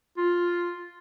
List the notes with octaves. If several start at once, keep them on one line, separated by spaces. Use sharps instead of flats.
F4